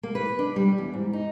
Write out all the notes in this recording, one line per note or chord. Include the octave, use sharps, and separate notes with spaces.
A#3
B4
D4
G3
E2
G#2
D#4